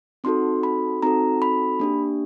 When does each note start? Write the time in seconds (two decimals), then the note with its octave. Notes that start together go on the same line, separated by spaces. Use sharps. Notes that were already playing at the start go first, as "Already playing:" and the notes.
0.24 C4 D#4 F#4 A4 C6
0.63 B5
1.03 C4 D#4 F#4 A4 A#5
1.42 B5
1.80 A#3 D4 G4